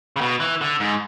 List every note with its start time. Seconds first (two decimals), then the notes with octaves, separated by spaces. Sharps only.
0.16 C#3
0.21 B2
0.40 E3
0.61 D3
0.80 G#2